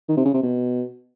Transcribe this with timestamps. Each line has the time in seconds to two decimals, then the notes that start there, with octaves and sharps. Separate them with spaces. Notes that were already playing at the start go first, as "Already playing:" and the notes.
0.08 D#3
0.17 C3
0.25 C#3
0.34 C3
0.43 B2